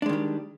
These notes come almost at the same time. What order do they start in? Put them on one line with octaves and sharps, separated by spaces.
D4 G#3 D#3 G3